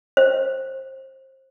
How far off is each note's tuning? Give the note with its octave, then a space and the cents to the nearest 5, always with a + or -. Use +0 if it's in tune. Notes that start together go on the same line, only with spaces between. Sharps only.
C5 +25